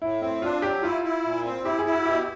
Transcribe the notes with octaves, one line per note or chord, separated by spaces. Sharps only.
A2 E4
C4 E4
D4 F4
F#3 G4
E4 F4
E4
A#2
C4
E4 G4
G#4
E4
F#4
B2 G4